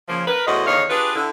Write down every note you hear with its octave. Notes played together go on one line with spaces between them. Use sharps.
C#3 F3 A#3
A#4 B4
E2 A2 F#4 C5 D#5
E2 D3 D#3 C#5 D#5 F5
D4 F4 G4 G#4 B4
D3 E4